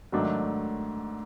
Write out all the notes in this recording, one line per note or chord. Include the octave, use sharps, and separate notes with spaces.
G#2 D#3 F#3 A3 D4